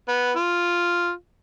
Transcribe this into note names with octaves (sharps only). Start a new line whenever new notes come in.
B3
F4